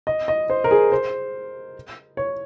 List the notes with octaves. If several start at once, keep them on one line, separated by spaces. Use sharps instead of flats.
D#5
D#5
C5
A#4
G#4
C5
C#5